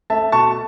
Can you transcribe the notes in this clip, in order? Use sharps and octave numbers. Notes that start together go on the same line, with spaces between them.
A3 E5 A5
B2 A5 C#6